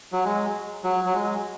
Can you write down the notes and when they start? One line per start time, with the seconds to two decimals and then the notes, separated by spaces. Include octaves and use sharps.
0.12 F#3
0.25 G#3
0.84 F#3
1.05 F#3
1.14 G#3